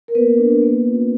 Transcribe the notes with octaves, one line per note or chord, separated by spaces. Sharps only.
A#4
A#3 B3 B4
D4 F#4
A#3
C#4 F4